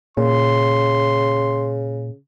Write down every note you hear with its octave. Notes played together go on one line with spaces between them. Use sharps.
A#2 C#3 C6